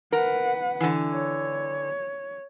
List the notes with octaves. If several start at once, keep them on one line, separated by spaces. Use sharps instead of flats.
A#4 B4 F#5
D3 E3
C#5